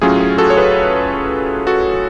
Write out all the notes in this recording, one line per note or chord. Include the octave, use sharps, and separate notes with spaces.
A2 F#3 C#4 F4 G#4
G#4
F#4 A4
C#5
G#4 B4
F#4 A4